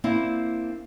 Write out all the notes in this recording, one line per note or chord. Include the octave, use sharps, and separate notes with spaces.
A#3 C4 D4 E4